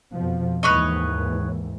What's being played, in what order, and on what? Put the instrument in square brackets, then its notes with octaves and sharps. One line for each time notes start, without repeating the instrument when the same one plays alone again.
[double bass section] F2 B2 F3
[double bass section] D#2 G#2 E3 [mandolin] B4 C#5 D#5